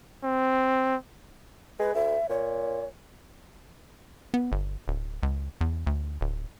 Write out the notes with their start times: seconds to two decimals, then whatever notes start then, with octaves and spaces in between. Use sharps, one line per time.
0.23 C4
1.79 G#3 B4
1.94 D2 E5
2.29 A#2 C#5
4.34 B3
4.52 G1
4.88 D1
5.23 C#2
5.61 E2
5.87 D2
6.21 D1